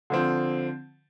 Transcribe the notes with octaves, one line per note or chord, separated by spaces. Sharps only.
D3 F3 C4